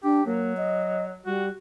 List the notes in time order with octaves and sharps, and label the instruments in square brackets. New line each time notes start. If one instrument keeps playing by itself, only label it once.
[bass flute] D4 [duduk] G4
[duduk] F#3 [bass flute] A#3
[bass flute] D#5
[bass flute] G3 [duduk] F#4